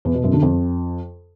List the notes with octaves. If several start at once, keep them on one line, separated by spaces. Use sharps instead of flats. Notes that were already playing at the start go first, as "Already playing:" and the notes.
E2
B2
F#2
D3
F2